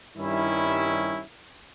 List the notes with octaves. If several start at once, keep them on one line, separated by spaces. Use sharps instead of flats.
G2 D#3 G3 C#4 E4